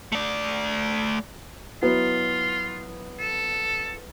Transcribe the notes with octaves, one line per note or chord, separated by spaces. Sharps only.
A3 D5
F#3 B3 E4 F4
A4